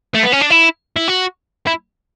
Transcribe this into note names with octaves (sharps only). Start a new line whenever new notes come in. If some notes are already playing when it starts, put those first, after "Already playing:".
A3
B3
C#4
D4
E4
E4
F#4
E4